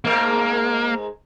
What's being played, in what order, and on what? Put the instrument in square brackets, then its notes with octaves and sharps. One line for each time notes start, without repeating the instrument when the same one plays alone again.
[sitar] G#2 G#3 A#4 [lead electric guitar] A#3